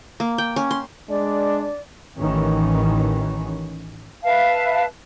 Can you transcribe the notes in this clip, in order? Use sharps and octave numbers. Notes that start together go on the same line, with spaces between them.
A#3
G5
C#4
C6
G#3 D4 D5
A1 D#3 E3 C#4
B4 E5 F5 A5